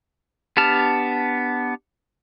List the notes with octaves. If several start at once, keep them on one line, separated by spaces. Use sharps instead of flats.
B3 D4 G4 A5 F6